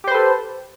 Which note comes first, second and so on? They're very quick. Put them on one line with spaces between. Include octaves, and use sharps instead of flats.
G4 C5 B4 A4